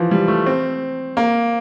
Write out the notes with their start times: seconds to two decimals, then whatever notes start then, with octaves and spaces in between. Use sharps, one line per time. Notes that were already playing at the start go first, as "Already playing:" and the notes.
Already playing: E3 F3
0.11 G3
0.28 A3
0.46 C4
1.17 A#3